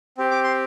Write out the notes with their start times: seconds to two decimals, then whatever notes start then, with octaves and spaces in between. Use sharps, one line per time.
0.18 C4 G4
0.31 D6
0.44 C6